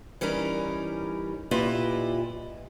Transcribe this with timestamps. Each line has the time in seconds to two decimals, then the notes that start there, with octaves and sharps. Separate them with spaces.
0.21 E3 G3 C#4 D#4 A#4
1.51 A#2 E4 F4 G4 B4 D#5